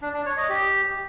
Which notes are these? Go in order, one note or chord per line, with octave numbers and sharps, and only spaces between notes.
D4
D4
C#5
D#5
G4